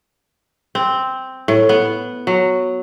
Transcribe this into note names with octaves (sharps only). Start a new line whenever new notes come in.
C4
A2
B3
F#3